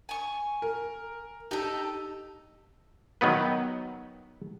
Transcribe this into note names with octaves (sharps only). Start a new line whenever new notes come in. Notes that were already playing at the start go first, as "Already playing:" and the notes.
G#5 C#6
A#4
D#4 G4 A4
D#3 F#3 B3 B4